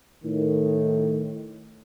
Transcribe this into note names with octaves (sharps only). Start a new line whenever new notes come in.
A2 D#3